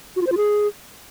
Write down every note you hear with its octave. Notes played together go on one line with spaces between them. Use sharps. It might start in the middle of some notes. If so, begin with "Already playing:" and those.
F#4
F4
C5
F4
G#4